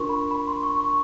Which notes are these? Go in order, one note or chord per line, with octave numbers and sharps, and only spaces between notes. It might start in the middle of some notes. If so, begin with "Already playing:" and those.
Already playing: D4 F4 A#4 C6 C#6
B5
B5
C6
C#6
C#6